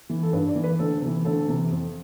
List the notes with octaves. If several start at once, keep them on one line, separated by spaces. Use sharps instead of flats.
E3
A4
G2 B4
D5
E3
B4
D2 A4
C3 E3
D2 A4
C3 E3
F2